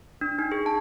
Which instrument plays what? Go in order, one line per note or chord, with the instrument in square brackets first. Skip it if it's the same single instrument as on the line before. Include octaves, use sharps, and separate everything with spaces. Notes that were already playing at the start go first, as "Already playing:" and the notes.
[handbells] D4
D#4
G#4
A5